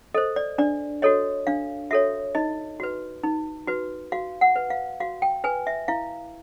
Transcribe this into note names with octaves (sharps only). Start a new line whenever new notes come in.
A4 C5 D#5
D5
D4 D5
F#4 A4 C#5 D#5
D4 F5
F#4 A4 C#5 E5
D#4 D#5
F#4 B4
D#4
F#4 B4
F#4 F5
F#5
B4
F5
F#4 F5
G5
B4 G#5
E5
E4 F5